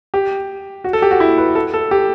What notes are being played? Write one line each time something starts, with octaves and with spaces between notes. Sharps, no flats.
G4
F#4
A4
G4
F#4
E4
B4
A4
A4
G4